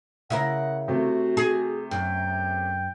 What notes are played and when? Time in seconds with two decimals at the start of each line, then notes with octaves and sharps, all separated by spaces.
0.30 C#3 E4 A#4 F#5
0.88 C3 A3 F#4
1.37 G#4
1.91 F#2 G5